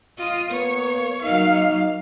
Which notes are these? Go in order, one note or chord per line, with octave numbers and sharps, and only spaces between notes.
F4 D#5
A#3 B3 C#5
F#3 A#3 D#4 F5